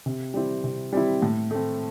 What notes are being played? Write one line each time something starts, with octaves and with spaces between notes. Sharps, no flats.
C3
G3 C4 E4
C3
G3 C4 E4
A2
A3 C4